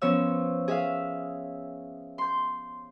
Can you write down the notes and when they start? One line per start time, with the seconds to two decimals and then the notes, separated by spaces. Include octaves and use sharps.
0.02 F3 B3 C#4 C#5 E6
0.68 G#4 E5 F5
2.18 C6 G6